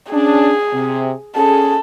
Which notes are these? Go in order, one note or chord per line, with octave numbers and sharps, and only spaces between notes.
C#4 D4 G#4
C3
C#4 G#4 A4